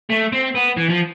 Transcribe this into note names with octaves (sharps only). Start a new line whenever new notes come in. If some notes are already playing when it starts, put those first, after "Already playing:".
A3
C4
B3
E3
F3